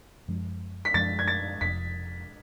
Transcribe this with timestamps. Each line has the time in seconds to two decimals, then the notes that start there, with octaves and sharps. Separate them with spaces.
0.28 F#2 F3 G#3 D4
0.85 B6
0.94 F#2 F3 G#3 D4 A6
1.19 G#6
1.28 A6
1.61 F1 F2 F3 B6